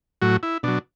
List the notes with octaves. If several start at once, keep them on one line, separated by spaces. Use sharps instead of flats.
A2 F#3 F#4
E4
B2 F#3 D4